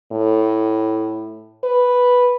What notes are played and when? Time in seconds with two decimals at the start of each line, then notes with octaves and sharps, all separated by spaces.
0.12 A2
1.64 B4